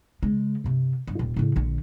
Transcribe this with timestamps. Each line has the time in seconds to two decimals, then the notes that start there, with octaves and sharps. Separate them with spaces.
0.23 C#3 G#3
0.64 G2 C3
1.07 G2
1.19 D#1 F4
1.37 A2 C#3
1.56 A#1 D3